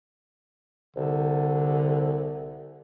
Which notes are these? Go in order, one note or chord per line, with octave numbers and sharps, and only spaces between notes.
C2 D3